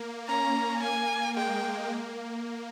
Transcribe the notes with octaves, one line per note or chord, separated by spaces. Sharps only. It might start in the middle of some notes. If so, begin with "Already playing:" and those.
Already playing: A#3
C#4 A#5
A#3 G#5
G#3 G5
A#3